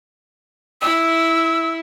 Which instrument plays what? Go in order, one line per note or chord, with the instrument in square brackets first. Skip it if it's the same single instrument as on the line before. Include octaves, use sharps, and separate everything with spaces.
[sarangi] E4 [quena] E6